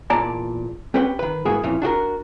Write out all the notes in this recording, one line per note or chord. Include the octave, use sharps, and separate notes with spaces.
E2 A#2 A#3 D5 A5 A#5
C4 C#4 G4 B4 F#5 G5
D#3 B4
G#2 A#3 B3 E4 F#4 G#4
F2 A#2 E3 C#4
D4 F#4 G4 A#4